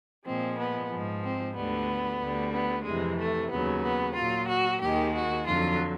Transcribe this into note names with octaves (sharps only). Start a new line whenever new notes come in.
A#2 F3 G#3 C4
B3
G#2 F3 G#3
C4
D2 D3 G3 B3
D2 D3 G3
B3
F2 C3 E3 G#3
A3
D#2 C#3 F#3 B3
B3
A#2 F#3 F4
F#4
D#2 D#3 G#3 G4
F#4
F2 D3 F#3 F4